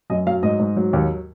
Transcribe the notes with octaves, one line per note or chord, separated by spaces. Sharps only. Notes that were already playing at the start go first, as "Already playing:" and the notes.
F#2 D#5
F#3 F5
G#2 D#5
G#2
F#3
D#2